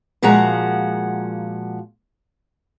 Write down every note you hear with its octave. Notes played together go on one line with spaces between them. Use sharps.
A#2 F3 G#3 F#4 F#5 A#5